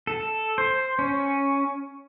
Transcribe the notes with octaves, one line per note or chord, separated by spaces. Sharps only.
A4
C5
C#4